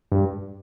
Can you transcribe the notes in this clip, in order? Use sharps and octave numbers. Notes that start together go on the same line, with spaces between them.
G2